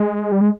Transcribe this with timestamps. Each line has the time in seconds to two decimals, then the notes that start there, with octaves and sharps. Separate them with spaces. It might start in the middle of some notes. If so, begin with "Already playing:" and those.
Already playing: G#3
0.32 G3
0.41 G#3